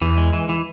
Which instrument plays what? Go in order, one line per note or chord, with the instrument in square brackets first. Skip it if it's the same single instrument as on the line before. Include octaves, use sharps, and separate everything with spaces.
[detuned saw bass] E2 [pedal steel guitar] E3
[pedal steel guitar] G#3
E3
E3